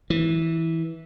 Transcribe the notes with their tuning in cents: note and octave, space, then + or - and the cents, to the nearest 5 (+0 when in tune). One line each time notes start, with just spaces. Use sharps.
E3 -10